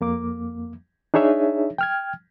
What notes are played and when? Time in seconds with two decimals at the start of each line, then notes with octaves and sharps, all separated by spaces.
0.01 F2 A#3 D6
1.14 D4 D#4 G#4 C#5 E5
1.78 G5 F6 G#6